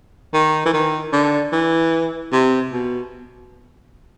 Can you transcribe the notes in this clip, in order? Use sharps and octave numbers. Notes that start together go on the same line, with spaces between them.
D#3
E3
D#3
D3
E3
C3
B2